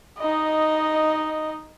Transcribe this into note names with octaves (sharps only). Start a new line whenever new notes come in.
D#4 D#5